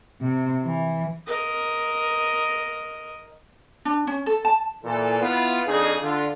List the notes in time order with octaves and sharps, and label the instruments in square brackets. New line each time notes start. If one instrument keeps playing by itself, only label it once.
[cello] C3
E3
[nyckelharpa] A#4 D#5
[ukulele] D4
C#4
A4
A5
[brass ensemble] A#2 E3 A4
B3 E4 F4
F2 D4 D#4 G#4
D3 F4